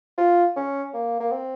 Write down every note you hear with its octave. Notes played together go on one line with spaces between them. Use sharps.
F4
C#4
A#3
A#3
C4